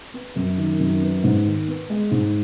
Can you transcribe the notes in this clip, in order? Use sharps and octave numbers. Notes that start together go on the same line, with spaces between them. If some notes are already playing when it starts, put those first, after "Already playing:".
B3
F#2
D#3
F#2
B3
G#2
D#3
B3
G#3
G#2